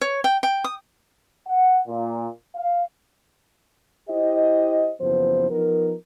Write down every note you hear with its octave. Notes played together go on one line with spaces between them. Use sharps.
C#5
G5
G5
D#6
F#5
A#2
F5
E4 G4 C5 D#5
F#1 E3 F3 B3 C5
F3 B3 D#4 A#4